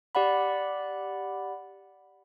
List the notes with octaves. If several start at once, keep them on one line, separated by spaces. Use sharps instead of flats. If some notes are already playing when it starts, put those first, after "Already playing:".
G4 D5 F#5 B5